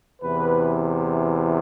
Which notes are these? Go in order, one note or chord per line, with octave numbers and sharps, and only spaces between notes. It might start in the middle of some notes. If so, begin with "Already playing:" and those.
E2 C3 E3 B4